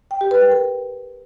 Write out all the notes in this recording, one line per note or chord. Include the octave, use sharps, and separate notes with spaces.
G5
G4
B4
G5
A#4